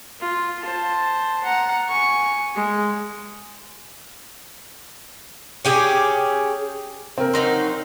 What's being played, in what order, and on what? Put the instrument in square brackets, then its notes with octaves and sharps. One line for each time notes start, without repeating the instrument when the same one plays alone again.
[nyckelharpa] F4
C5 A5
F#5 A#5
G#5 C#6
G#3
[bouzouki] C#4 G4 G#4
[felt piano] C4 A#4
[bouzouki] F#3 D#4 C5